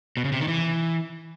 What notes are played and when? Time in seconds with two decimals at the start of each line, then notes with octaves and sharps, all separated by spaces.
0.17 B2
0.25 C#3
0.32 C3
0.40 D#3
0.48 E3